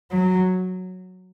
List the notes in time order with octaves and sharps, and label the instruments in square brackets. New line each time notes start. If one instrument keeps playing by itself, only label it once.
[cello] F#3